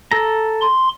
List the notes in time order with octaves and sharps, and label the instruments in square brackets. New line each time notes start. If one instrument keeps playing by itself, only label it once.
[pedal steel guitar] A4 A#5
[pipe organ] C6